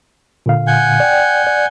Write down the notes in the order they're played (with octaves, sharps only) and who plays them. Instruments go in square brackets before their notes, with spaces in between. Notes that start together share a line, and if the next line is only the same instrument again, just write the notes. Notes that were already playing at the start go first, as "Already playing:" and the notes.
[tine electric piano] A#2 D3 F5
[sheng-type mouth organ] F#5 G#5 G6
[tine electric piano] D5 G5
D5